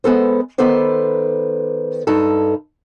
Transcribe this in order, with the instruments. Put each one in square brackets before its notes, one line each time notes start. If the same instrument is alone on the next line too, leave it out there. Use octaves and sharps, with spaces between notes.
[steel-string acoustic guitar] G#3 B3 A4 C5
D#3 B3 A4 B4 C5 D5
G2 D#4 A4